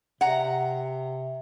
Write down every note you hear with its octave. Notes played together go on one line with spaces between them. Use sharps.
C3 F#5 A#5